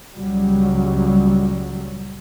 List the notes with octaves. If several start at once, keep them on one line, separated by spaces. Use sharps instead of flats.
C#2 A#2 F#3 G3